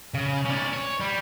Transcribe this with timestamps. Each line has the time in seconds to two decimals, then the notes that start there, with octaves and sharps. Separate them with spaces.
0.14 C#3
0.45 C#4 D5
0.73 C#5
1.00 G3